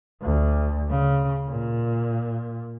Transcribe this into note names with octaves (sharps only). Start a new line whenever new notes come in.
D2
C#3
A#2